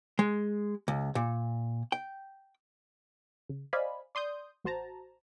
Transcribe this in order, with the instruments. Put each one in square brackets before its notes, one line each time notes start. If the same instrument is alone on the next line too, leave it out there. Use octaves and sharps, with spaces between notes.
[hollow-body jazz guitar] G#3
C#2
A#2
G5
[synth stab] C#3
C5 D5 D#5 F5 G#5 B5
D5 C6 D#6 G6
A1 F#4 C5 A5 A#5